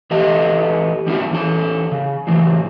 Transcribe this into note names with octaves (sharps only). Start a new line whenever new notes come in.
E2 B3 G4 A4 D#5 A5
G3 C#4 E4 F#4
E2 C#4 A4
C#3
A2 C#3 E3 F#3